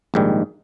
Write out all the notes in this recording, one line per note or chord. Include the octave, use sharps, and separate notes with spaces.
A#1 G#2 D#3 G3